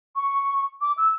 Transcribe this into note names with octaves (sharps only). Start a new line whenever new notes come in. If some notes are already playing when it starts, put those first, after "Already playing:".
C#6
D6
E6